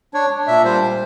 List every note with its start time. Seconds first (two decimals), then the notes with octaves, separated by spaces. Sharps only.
0.14 D4 C#5
0.30 D4
0.47 A#2 E5
0.64 G3 C5
0.82 D4